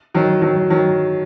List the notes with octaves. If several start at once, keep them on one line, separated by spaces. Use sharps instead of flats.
D#3 F#3
D#3 F#3
D#3 F#3